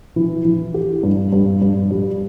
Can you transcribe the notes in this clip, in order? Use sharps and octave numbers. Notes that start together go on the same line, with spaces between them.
E3
E3
G4
G2
G2
G2
G3